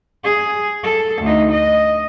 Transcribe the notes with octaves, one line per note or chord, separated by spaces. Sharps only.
G#4
A4
D2 D#4
D#5